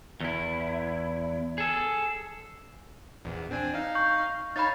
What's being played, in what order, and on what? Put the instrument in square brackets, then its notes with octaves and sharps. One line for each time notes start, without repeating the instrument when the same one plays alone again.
[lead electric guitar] E2 E4
G#4 A4
[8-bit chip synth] A#1 E2
C4 D4 G#5
D#4 F5
[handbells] C#6 G6
[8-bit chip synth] D#4 C#5 F5 [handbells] B5 A6